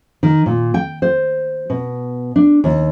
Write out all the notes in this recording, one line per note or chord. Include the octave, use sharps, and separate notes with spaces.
D#3
A#2
G5
C5
B2
D4
D#2